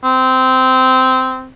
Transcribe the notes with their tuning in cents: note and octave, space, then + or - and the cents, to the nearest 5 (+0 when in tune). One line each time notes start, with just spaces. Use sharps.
C4 -15